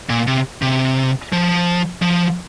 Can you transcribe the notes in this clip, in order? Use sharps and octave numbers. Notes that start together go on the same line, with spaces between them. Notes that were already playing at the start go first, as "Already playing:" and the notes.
A#2
C3
C3
F3
F3